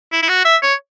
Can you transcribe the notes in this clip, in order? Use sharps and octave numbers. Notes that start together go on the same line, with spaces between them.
E4
E4
F#4
E5
C#5